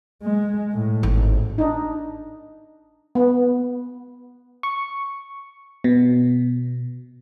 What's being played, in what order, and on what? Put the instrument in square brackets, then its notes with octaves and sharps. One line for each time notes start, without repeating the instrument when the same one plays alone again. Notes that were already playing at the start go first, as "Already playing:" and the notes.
[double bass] G#3
A2
[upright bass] G#1
[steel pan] D4 D#4
B3
[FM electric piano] C#6
B2